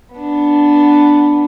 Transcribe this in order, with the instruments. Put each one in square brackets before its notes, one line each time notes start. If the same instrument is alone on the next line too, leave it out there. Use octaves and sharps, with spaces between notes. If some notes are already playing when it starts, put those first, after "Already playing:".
[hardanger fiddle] B3 D4